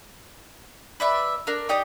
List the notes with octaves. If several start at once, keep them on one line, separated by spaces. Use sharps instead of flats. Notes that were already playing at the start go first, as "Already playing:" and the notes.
B4 D5 E5
D4 A#4
D#4 G4 D5 D#6